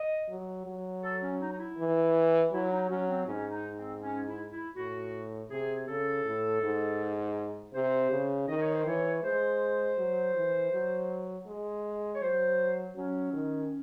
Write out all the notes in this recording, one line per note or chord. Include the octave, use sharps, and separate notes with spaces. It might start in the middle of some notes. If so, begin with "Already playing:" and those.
Already playing: D#5
F#3
F#3
A4
C#4
D#4
D#4
E4
E3
F#3 E4
D#4
F#3 C#4
C4
G#2 C#4
D#4
C4
C#4
E4
E4
A2 F#4
C3 G#4
C#3 A4
A2
G#2
C3 C5
C#3
D#3 D#5
C#5
C5
E3 C#5
G#3 C5
F#3
E3
F#3
G#3
C#5
F#3 C5
F#3 C#4
D#3